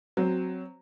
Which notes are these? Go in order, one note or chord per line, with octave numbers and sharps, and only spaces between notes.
F#3 C4